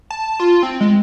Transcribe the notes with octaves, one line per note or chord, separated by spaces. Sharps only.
A5
F4
C4
G#3